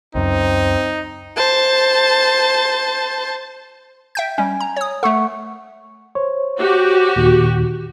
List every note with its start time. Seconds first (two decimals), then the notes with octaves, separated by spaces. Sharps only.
0.15 C#2 F#2 C4 D#4
1.37 C5 A5
4.15 E5 G5 G6
4.38 G3 C#4 G#5
4.60 A#5
4.76 C#5 D#6
5.03 A3 A4 F#5 C#6
6.15 C5 C#5
6.59 F#4 G4
7.16 D#2 A#2 D#3